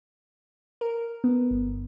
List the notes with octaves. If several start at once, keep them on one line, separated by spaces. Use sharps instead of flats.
A#4
B3
G1